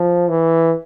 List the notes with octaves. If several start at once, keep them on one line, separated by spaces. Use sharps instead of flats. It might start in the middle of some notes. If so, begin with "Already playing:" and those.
Already playing: F3
E3